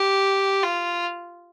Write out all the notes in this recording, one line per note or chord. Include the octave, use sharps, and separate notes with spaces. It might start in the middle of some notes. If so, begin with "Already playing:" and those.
Already playing: G4
F4